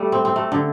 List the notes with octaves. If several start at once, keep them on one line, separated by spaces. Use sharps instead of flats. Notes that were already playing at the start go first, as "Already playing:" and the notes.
Already playing: G3 A3
C4
C4
A3
D3